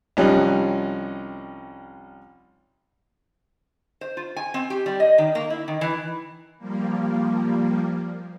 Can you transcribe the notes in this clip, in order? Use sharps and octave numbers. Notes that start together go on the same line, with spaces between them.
C2 F3 G3 C#4 D#4 F#6
C5
F4
G#5
C4
G4
G3
D#5
D#3
A#3
E4
D#3
E3
F3 G3 A#3